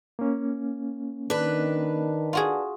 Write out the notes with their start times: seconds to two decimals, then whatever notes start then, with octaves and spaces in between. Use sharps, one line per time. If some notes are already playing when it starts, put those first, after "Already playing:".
0.19 A#3 C#4
1.30 D#3 D4 B4
2.33 F4 F#4 G#4